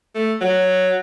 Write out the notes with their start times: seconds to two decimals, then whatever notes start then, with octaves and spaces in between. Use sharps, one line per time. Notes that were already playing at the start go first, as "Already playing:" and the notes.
0.15 A3
0.41 F#3